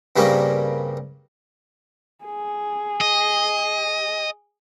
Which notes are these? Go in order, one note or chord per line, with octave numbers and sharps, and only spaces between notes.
G2 C#3 G3 A#3 C4 C#6
G#4
D#5